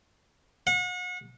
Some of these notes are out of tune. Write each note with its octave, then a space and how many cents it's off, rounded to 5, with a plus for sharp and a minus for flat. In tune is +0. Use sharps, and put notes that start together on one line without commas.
F#5 -35